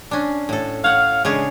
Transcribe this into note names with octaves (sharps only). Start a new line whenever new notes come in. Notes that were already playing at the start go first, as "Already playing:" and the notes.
C#4 D4
A2 A4
C#5 F5 F#5
C#3 G#3 D4 C#5